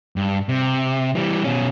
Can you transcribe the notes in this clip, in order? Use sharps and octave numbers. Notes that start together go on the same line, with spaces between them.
G2
C3
E3 G3
B2 C#4